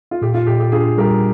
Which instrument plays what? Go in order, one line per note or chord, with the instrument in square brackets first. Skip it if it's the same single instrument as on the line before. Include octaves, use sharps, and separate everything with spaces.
[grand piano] F4
[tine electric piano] A#2 [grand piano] G4
[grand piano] F4
[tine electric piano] A#2 [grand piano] G4
[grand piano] G4
[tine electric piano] D4 [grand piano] F4 G#4
[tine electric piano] G3 [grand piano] G4 A#4